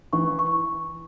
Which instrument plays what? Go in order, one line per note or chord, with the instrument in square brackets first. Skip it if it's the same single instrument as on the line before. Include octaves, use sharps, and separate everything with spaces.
[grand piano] E3 [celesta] C#6
[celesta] C#6